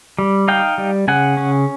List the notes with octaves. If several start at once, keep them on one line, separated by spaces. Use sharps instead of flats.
G3
D#4 F5 G5
G3
C#3 F#5 G#5
C#4